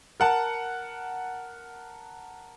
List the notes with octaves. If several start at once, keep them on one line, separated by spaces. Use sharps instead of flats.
A#4 F#5 A5